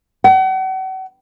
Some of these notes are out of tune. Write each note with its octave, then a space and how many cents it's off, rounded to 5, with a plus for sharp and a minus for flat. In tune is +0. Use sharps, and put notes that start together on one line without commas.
F#5 +40